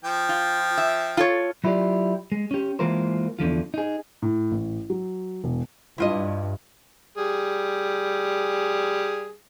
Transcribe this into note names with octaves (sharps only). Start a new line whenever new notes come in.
F3 G5
F4
E5
F4 A4 C#5
F#3 E4 F4 G4 D5
G#3
C#4 G4
E3 G#3 A#3 F4 A#4 C5
E2 D3 F3 F4
D#4 G#4
A2
A1
F#3
E1
G2 E4 F4 D#5
G3 G#4